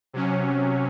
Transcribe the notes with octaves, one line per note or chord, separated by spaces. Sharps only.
C3 F#3 C#4